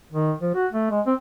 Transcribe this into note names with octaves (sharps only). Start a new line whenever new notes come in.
D#3
F3
F#4
A3
G#3
C4